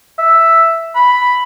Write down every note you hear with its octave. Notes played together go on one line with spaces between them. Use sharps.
E5
B5